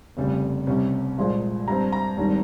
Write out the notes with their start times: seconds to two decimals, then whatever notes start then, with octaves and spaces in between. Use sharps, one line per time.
0.17 F1 F2 C#3 G3
0.67 C2 C3 G3 C#4
1.17 C2 A#2 F3 G#3
1.68 G2 G3 C4 A#5
1.93 A#5
2.17 G#1 G2 D#3 G3 C#4